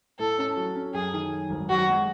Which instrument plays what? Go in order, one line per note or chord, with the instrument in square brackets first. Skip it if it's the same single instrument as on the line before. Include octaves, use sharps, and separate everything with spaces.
[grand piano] A2 [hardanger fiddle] A4
[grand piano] C#4
F#3
C#4
[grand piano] F#2 [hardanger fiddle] G#4
[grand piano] D#3
F#2
G#1
[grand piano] F#2 [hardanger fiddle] F#4
[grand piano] G#3